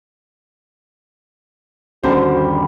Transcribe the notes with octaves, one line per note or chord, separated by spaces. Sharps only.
G1 D#2 D3 G3 C#4 F#4 A#4 C5